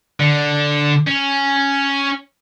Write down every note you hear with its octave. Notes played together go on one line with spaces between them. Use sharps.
D3
C#4